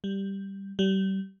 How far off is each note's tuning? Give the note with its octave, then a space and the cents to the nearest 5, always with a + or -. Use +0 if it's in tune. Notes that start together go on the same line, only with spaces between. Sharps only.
G3 +0
G3 -30